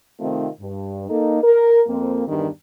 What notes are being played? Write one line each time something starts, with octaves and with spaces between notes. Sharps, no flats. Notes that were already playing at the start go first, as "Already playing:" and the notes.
C3 D#3 A3 C4 D#4 F4
G2
A#3 D#4 A4
A#4
F2 A#3 C4
E2 G2 D#3 G3 D4